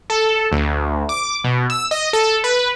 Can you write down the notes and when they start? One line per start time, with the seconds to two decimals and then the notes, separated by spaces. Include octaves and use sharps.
0.10 A4
0.52 D2
1.09 D6
1.44 B2
1.70 E6
1.91 D#5
2.13 A4
2.44 B4